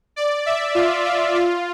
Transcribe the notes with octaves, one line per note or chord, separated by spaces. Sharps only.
D5
E5
F4
F4
F4